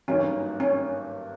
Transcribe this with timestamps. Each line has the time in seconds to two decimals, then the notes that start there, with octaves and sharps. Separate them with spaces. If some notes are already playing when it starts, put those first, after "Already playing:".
0.08 G#1 G2 D#3 F#3 A#3 C#4
0.60 C#4